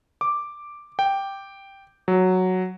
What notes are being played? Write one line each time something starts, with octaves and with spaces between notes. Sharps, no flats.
D6
G5
F#3